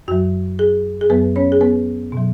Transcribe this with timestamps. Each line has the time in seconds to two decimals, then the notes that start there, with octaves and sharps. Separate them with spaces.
0.08 F#2 F#3 F#4
0.59 G#4
1.01 G#4
1.10 F#2 F#3 B3 B4
1.36 C#4 C#5
1.52 G#4
1.61 B3 B4
2.12 B2 F#3